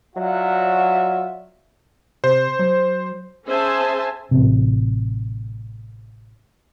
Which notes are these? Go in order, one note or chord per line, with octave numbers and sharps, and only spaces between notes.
F#3 F4 F#4 D5 E5 F#5
C3 C5
F#3
C#4 G#4 C5 E5 G#5 A5
A1 C3